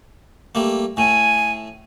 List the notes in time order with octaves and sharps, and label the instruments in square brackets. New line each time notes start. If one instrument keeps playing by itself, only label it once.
[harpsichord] G3 A3 A#3
[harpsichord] A2 A3 [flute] G#5